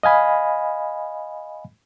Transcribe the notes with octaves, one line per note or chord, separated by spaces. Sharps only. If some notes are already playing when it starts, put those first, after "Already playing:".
D#5 F5 G#5 B5